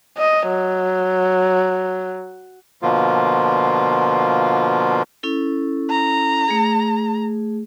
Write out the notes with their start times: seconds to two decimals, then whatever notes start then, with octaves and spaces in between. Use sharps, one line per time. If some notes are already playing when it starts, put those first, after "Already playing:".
0.17 D#5
0.48 F#3
2.82 B2 D3 F3 A#3 F4
5.23 C#4 E4 A4
5.90 A#5
6.48 A3 G#4